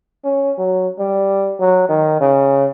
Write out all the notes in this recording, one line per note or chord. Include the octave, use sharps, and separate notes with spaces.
C#4
F#3
G3
F#3
D#3
C#3